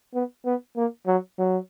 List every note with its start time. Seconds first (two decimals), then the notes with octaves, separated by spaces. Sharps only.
0.14 B3
0.45 B3
0.76 A#3
1.07 F#3
1.39 F#3